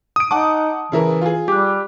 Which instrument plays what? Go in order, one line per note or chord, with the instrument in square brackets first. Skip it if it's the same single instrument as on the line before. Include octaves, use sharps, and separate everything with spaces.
[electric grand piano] D#6 D7
[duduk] D#4 [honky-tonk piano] F#5 D6 [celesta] A5
[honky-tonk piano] C#3 E4 A#4 [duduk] E3
[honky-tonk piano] F4 G#4
[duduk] G3 [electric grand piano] G4 [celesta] D6 F#6